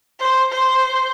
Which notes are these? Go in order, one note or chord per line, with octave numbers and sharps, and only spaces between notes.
C5
C5